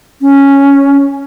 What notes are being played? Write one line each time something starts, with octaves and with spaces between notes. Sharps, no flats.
C#4